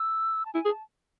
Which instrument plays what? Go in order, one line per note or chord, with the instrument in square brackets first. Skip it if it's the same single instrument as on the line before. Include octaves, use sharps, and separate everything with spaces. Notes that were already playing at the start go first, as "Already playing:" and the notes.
Already playing: [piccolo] E6
A5
[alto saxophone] E4 [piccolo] G#5
[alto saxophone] G#4
[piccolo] A5